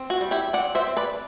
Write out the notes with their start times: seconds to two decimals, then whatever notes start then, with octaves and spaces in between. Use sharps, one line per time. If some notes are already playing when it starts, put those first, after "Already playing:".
Already playing: C4
0.10 F#4
0.21 G3
0.31 E4 G4
0.53 C4 D5 F#5
0.75 C5 E5
0.87 C4
0.97 B4 D5